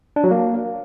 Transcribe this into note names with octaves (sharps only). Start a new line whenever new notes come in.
D4
F#3
A#3